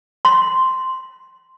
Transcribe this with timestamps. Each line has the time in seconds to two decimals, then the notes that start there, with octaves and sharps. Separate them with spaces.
0.25 C6